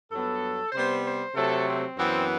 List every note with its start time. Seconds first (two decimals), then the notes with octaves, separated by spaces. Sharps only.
0.10 G2 F#3 B3 A4
0.72 C3 G3 B3 C5
1.03 C5
1.35 C3 F#3 A3 A4
1.66 C4
1.96 F#2 E3 B3 C4